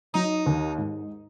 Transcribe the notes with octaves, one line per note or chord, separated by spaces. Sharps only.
F#3 D#4
D#2
G#2